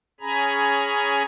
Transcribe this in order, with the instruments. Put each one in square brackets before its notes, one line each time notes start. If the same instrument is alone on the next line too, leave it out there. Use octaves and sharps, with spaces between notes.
[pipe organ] C#4 G#4 G#5 A#5 B5